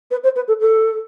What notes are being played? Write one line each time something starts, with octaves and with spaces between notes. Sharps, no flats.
B4
C5
B4
A4
A4